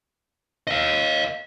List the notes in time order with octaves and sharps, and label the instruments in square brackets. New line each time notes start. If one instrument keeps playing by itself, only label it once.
[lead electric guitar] D#5 F5